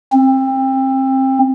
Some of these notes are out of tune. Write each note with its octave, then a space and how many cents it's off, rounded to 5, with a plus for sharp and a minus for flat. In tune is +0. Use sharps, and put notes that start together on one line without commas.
C4 +25